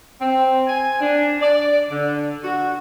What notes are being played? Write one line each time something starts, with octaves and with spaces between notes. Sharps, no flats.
C4
G#5
D4
D5
D3
F#4